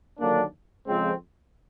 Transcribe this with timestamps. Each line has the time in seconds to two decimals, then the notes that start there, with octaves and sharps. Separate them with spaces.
0.19 D#2 D3 F#3 A#3 D4
0.87 F2 C#3 F3 G#3 C4